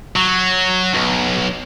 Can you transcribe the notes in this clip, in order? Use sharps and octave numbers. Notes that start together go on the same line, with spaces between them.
F#3
B1